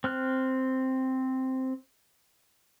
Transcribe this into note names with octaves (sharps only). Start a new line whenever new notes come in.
C4 F6 F#6